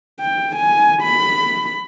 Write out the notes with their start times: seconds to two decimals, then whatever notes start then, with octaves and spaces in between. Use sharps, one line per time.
0.20 G5
0.56 G#5
1.02 B5